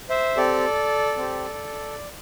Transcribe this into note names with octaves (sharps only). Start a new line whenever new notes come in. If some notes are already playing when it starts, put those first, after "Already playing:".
C5 E5
C4 G4 A4 D5
C4 G4